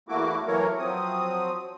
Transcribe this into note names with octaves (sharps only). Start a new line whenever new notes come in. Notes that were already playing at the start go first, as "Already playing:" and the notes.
E2 A3 A#3 E4 F#4 D6
E3 F#3 A3 A#3 A#4 C#5
F3 F#3 C4 D#6